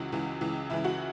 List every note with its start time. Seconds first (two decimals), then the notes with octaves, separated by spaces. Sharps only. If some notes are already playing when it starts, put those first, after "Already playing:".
Already playing: C#2 C#3 E3 F#4
0.12 C#2 C#3 E3
0.41 C#2 C#3 E3
0.70 C#2 C#3 E3 E4
0.84 F#4